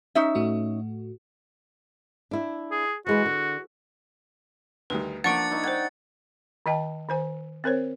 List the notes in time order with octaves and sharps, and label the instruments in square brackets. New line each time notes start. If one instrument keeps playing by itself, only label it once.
[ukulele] C#4 D#4 E5
[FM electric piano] A2 A3 F#4
[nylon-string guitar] D4 E4
[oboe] G#4
[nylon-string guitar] E3 G#3 B4 [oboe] F#4
[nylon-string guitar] D3
[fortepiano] D2 D#3 G3 [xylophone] B4
[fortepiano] F3 A#3 [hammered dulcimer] D4 [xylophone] F#5 C#6 D7 [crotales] A6 C#7
[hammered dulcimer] D#4 C#5 E5
[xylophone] C5 G#6 [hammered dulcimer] F#5 G5
[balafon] D#3 D#5 G5 A5
D#3 C5 G#5
C4 A#4 C5 C#5